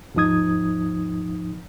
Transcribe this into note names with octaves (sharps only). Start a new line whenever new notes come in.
D#2 G#2 F3 D#4 D#6 G#6